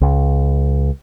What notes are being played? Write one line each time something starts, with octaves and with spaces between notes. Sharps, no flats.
C#2